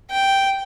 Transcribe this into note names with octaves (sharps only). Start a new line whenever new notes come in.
G5